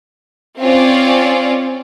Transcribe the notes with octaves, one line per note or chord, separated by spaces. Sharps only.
C4 C#4 F4 C#5 D5